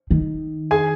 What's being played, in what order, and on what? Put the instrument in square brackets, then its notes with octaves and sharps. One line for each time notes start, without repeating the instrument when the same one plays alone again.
[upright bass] D#3
[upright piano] G#4 G#5